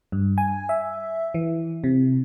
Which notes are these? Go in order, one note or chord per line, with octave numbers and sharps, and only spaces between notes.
G2
G#5
E5
E3
C3